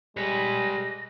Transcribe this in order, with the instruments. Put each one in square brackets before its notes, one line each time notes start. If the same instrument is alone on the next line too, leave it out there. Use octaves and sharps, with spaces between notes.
[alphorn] G3 [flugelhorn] G#3 [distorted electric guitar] B4 C#5 [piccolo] A#6